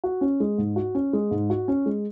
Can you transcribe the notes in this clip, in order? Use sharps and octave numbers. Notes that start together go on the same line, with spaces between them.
F#4
C#4
G#3
G#2
F#4
C#4
G#3
G#2
F#4
C#4
G#3